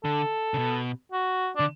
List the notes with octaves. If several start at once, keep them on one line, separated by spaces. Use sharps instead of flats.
D3 A4
C#3
B2
F#4
D3 D4